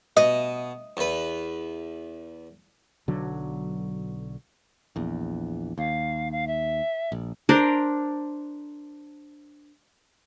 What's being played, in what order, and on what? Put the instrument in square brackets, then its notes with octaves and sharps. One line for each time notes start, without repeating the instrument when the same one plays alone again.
[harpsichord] B2 [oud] D#5
[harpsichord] E2 B4
[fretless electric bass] B1 D3 F#3
[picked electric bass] A#1 E2
[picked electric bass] D#2 [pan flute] F5
[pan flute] F5
E5
[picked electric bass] A#1
[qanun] D4 A#4 C5 D5